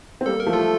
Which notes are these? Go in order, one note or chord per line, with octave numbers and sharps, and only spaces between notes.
C4
G3 A#3 A4
A#4
F3 A3
F4 A4
A3